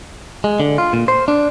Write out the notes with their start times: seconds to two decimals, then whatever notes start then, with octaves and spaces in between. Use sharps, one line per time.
0.44 G#3
0.60 D3
0.78 F4
0.93 A#2
1.08 C5
1.28 D4